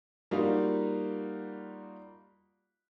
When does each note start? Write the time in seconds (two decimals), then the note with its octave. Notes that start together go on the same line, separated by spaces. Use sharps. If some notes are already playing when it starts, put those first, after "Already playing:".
0.31 G3 A#3 D#4 F4 F#4